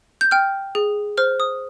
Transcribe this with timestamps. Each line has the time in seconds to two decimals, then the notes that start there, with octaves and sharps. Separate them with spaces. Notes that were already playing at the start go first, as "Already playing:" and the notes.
0.21 G6
0.31 G5 F6
0.75 G#4
1.17 C5 F6
1.40 D#6